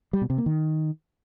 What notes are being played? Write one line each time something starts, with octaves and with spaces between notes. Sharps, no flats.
G3
B2
C3
A#3
D#3